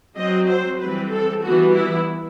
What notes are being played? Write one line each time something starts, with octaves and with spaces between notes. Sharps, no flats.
F#3 C4 D#5
C5
E3 G3 C4 B4
A4
E3 G3 B3 F#4
E4